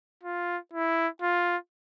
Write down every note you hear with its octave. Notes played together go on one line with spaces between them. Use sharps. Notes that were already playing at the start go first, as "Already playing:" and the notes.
F4
E4
F4